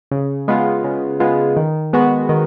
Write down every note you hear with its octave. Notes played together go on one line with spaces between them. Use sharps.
C#3
G#3 B3 F4
C#3
G#3 B3 F4
D#3
G#3 B3 F#4
D#3